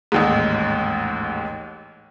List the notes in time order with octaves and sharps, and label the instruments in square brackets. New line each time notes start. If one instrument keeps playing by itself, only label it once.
[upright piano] A1 D#2 G#2